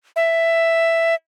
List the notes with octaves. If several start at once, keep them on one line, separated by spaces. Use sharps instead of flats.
E5